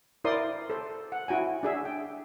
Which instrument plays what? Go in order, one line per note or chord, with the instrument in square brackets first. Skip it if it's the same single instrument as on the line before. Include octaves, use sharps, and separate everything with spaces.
[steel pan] E4 A#4 C5 D5 C6 D#6
A4 C5
F#5
E4 F#4 G5 G#5
D4 G#4 E5
G5